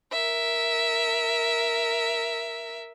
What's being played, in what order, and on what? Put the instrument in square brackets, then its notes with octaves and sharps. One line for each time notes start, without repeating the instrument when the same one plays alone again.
[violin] A#4 E5